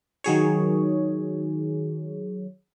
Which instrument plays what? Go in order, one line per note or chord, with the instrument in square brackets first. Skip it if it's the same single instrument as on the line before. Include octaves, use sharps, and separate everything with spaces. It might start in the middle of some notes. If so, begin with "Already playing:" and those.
[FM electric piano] D#3 F#3 G#4 C#5